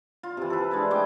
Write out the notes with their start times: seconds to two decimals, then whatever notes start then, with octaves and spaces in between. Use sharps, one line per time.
0.23 F4
0.37 C3 E3
0.50 A4 B4
0.71 G#3 D4 E4
0.91 A3 G#4 G5 D6